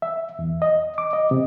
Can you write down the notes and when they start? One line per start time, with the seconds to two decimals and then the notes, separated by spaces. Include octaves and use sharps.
0.02 E5
0.39 E2
0.62 D#5
0.98 D6
1.13 D#5
1.31 C3